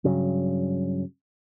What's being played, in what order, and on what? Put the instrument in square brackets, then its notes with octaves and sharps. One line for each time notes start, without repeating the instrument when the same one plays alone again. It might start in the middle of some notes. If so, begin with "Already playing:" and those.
[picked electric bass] G2 C#3 F#3